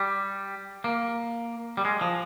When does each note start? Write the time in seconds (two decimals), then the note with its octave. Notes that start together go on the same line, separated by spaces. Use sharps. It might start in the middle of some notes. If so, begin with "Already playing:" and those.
Already playing: G3
0.84 A#3
1.77 G3
1.85 G#3
2.01 F3